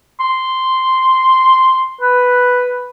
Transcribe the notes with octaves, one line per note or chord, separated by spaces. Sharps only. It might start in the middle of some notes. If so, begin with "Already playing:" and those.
C6
B4